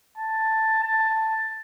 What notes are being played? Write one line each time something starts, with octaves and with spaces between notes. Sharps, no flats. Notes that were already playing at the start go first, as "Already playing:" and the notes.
A5
A5